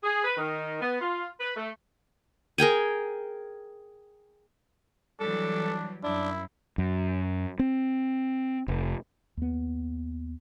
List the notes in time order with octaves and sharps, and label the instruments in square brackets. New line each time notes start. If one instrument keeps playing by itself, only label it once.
[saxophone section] G#4
B4
D#3
B3
F4
B4
A3
[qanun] G#4 A#4 G5 G#5
[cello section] E3 F#3 G3 [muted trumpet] D4 [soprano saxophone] A4
[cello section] F#2 [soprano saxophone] D4 [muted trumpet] E4
[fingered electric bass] F#2
C4
F1
[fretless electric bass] D#2 B3